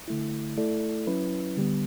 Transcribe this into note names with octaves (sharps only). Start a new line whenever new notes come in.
D3 A3 E4
A3 E4 A4 D5
F#3 C#4 E4 B4
D3 G3 B3